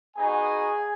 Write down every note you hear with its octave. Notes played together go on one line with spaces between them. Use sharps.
B3 D#4 F#4 G#4 G#5